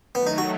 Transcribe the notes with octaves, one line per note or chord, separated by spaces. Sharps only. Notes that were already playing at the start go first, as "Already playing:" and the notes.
D#3 F#3 A3 B3
D#4
F#4